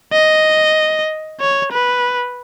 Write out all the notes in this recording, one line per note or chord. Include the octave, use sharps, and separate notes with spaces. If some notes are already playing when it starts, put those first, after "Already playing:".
D#5
C#5
B4